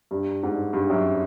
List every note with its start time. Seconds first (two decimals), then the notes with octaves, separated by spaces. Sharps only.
0.11 G2
0.43 G#2
0.73 G2
0.90 F#2